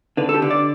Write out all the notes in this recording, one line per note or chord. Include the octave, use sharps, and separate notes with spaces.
D3 B4
A4
G4
D3
D5